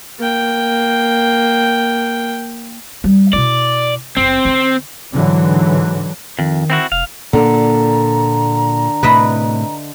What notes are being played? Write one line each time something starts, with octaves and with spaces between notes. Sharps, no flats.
A#3 G5
G3
B2 E4 D5
F#1 C4
D3
G#2 D3 E3 F#3
F2 D#3
C4 E4 F#4
F1 F5
A#2 D3 A#3 A#5
A2 C3 B4 D#5 E5